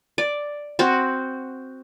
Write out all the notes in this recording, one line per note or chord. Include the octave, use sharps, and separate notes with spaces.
D5
C4 F#4